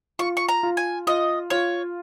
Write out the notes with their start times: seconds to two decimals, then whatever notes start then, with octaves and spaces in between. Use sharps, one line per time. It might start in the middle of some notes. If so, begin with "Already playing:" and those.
0.19 F4 C#6
0.37 C#6
0.49 A#5
0.63 F4
0.77 G#5
1.07 F4 D#5
1.50 F4 C#5